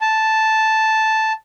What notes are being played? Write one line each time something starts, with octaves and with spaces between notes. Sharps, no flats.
A5